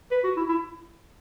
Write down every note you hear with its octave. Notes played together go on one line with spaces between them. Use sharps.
B4
F#4
E4
E4